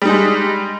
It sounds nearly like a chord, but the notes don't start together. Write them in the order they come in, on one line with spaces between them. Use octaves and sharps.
G3 D#4 G#3